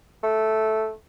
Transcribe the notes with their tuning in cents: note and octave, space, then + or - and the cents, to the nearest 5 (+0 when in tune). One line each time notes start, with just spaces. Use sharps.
A3 -5